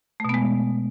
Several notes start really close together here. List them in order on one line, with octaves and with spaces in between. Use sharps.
A3 B2 B3 G#3